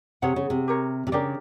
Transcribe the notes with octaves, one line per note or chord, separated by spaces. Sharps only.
C3 G#4 C#5 F#5
C#3
C3
G4 A#4 C#5
C3
C#3 D4 G4 A#4 D5